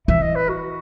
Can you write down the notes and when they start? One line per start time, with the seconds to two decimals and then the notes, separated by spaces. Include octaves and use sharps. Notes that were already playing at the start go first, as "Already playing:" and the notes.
0.08 E3 E5
0.22 D#5
0.35 B4
0.49 F#4